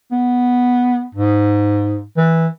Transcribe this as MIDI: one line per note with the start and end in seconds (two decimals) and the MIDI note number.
0.12 1.04 59
1.15 2.03 44
2.17 2.47 52